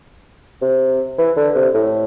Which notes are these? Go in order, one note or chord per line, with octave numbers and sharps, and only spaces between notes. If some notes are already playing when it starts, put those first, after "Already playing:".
C3
E3
D3
C3
A2